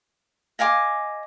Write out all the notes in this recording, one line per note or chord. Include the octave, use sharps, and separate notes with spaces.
D#5 F5 G#5 D6